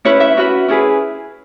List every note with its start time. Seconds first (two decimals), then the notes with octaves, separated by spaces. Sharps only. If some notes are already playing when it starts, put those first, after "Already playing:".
0.05 C#4 E4 B4 C#5
0.20 E5
0.37 C#4 F#4 B4
0.68 C#4 E4 G#4 B4